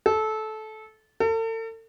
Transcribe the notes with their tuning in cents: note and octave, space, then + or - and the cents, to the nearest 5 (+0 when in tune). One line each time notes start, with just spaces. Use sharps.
A4 -20
A4 +40